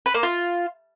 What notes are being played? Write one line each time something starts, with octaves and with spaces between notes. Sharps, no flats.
B4
A#3
F4